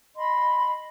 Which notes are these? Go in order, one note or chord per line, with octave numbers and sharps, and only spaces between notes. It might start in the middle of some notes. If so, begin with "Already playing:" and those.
D#5 B5 C6